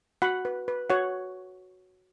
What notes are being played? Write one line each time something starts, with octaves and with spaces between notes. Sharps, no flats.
F#4 F#5 B5
B4
B4
F#4 C#5 F#5